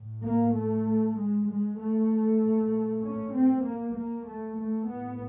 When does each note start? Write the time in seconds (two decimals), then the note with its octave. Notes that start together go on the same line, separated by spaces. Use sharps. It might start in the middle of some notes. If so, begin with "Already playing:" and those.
Already playing: A2
0.22 A#3
0.53 A3
1.16 G#3
1.47 G#3
1.78 A3
2.40 A#2
3.03 C#4
3.34 C4
3.65 A#3
3.96 A#3
4.27 A3
4.58 A3
4.89 A2 B3